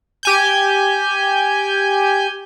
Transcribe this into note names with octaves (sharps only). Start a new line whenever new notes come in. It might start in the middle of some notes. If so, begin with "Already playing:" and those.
G4 G#5 G6